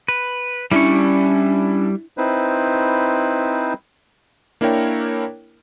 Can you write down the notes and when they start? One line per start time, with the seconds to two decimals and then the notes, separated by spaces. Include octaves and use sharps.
0.08 B4
0.71 G3 C#4 D4 E4 C#6
2.18 C4 D#4 E4 B4 C5
4.61 A#3 D4 E4 A#4 C#5 G5